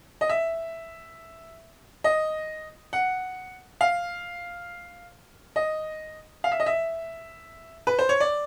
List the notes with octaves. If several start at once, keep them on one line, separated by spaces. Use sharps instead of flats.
D#5
E5
D#5
F#5
F5
D#5
F5
E5
D#5
E5
B4
C5
C#5
D5